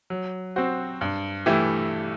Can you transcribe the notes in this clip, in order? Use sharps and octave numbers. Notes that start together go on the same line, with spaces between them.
F#3
C4 F#4 C5
G2
E3 A3 E4 G4